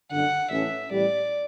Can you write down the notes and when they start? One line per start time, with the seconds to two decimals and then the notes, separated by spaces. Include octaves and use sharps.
0.11 G1 F#2 D3 F#5
0.51 A1 A2 E3 A3 C#4 E5
0.92 A1 A2 G3 D5